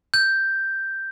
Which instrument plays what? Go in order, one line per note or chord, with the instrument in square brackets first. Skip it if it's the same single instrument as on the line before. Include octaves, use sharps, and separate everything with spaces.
[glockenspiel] G6